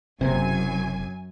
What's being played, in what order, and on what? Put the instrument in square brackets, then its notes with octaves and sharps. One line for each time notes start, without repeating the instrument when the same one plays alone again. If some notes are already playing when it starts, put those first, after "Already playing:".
[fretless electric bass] F#1 C3 [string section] F#2 G#5